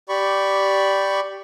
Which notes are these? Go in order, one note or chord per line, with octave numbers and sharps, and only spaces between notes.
G4 D5 B5 C#6